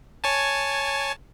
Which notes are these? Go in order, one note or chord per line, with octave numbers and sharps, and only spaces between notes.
C#5 G#5 A5